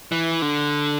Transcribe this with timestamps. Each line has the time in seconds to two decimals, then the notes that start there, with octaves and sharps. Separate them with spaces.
0.12 E3
0.42 D3